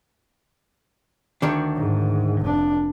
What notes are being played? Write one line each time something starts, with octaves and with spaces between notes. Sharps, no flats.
D2 D#3 D4
G#2
F1 D4